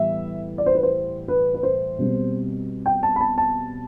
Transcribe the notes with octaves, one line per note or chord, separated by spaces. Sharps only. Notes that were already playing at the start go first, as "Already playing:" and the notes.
Already playing: A2 E3 G3 B3 E5
D5
C5
B4
C5
B4
B4
C5
B2 G3 C4
G5
A5
B5
A5
A5